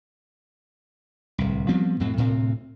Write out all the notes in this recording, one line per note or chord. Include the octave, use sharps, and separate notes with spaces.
D1 C2
F3 G3 B3 C4
F2 A2 F#3 C4
D2 A2 C3 C4